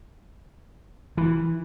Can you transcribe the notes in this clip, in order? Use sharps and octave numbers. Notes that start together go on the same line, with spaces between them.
E3